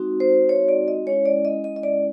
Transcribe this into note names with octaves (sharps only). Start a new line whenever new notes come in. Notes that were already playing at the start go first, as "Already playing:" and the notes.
Already playing: G#3 C4 D#4 F#4
C5
C#5
D5
D#5
G#3 C#4 E4 C#5
D5
D#5
D#5
D#5
D5